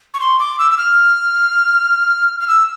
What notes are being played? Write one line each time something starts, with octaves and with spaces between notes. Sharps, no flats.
C#6
C6
D6
E6
E6
F6
F6
E6